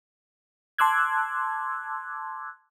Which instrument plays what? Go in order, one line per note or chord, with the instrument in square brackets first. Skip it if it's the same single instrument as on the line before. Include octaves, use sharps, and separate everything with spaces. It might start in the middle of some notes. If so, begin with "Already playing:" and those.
[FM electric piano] A5 C6 D6 E6 F#6 G#6